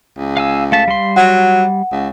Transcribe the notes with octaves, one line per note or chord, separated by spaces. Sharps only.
C#2
F5 G#5 E6
A3 F5 A5 B6
G3 C6
F#3 F#5
C#2